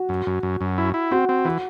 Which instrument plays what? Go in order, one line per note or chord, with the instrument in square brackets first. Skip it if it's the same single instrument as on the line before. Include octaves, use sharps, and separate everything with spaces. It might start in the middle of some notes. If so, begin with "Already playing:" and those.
Already playing: [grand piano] F#4
[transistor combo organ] F#2
F#2
F#2
F#2
E4
E4
[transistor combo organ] C4 [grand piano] F#4
[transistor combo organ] C4
[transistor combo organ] E3 [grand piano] F#4